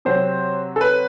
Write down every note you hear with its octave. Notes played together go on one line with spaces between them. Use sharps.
C3 F#3 C4 C5
A4
B4